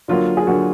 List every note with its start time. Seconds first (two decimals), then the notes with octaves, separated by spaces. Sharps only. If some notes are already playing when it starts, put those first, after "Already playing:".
0.08 D3 F#3 A#3 F4
0.37 G#4
0.47 D3 F#3 A#3 F#4